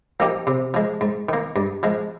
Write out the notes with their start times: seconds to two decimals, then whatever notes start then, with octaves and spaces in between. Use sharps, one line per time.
0.20 F3 A#3 D#4 G4
0.47 C3
0.74 F3 G#3
1.01 G#2
1.29 D#3 A#3
1.56 G2
1.83 F3 G#3